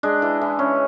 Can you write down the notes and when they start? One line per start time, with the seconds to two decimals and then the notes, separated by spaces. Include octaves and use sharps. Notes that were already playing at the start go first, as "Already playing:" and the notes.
0.03 G#3 D4
0.22 E3
0.41 E3
0.59 C#4